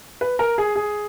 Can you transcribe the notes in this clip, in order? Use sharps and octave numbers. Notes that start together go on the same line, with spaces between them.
B4
A#4
G#4
G#4